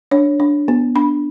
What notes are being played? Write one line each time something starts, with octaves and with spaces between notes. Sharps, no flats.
D4 C#5
D4
B3
D4 B5